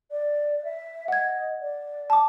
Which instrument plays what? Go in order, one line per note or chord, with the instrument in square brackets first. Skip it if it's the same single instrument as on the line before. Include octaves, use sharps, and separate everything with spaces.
[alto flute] D5
E5
[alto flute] D#5 [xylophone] F#5 G#6
[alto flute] D5
[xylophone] A5 D6